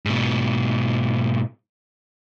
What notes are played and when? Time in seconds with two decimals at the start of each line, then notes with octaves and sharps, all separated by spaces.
0.06 G#2 B2